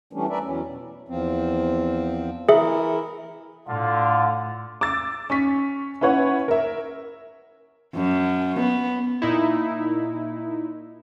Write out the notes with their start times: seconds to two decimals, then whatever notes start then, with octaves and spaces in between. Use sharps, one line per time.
0.13 E3 G3 A3 C#4 D4
0.30 A#4 B4 D5 E5
0.43 E2 E3 F#3 C#4
0.67 B2
1.08 E2 F3 C4
2.49 E3 E4 G#4 A#4 E5
3.68 A2 D3 F4
4.81 D6 E6 A6
5.30 C#4 C#6 B6
6.01 C#4 E4 B4 C#5 F#5
6.48 A#4 E5
7.96 F#2
8.60 B3
9.22 A#2 D#4 E4